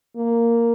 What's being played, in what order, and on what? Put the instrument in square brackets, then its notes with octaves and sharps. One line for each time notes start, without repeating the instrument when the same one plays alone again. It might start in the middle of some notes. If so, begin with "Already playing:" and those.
[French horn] A#3